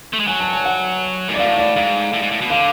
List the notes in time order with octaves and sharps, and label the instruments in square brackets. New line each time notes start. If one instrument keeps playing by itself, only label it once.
[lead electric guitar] A3
G#3
[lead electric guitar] F#3 [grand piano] G#5
[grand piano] A5
G#5
F#5
[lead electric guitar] G#2
[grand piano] D5
[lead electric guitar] A2 [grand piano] F5
[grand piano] D5
[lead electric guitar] G#2 [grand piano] F5
[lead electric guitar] A2
G#2
A2
B2
[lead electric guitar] D3 [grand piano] F5